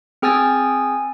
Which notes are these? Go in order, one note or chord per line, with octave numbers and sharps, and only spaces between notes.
C4 G#4 G5 G#5 E6 A6